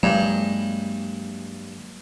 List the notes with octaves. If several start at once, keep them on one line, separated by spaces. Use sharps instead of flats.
G2 F#3 G#3 A#3